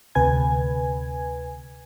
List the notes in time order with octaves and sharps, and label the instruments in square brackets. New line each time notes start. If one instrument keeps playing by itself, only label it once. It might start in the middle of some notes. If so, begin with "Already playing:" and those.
[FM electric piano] D2 C3 B4 G#5 G#6